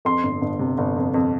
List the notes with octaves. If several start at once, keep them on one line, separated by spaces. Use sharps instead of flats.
F2 C6
G1
G1
C3
G1
F2
F2